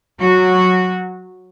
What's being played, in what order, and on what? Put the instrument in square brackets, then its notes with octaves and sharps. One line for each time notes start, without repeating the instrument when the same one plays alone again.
[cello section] F#3 F#4